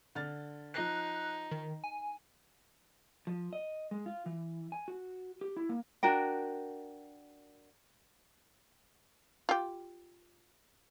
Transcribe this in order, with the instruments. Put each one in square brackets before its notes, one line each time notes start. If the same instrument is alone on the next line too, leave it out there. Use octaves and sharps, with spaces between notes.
[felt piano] D3 F6 A6
[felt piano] F3 A#6 C7 [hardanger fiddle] D#4 [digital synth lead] F#6
[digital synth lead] D#3
G#5
[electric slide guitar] F3
D#5
G#3
F4
E3
G#5
F#4
G4
E4
A#3
[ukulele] D4 F#4 A#4 G5
[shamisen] F4 G4